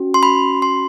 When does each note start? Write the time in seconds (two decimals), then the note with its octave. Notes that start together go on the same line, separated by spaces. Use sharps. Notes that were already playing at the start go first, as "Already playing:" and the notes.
Already playing: C#4 F#4
0.14 C6
0.23 B5
0.62 C6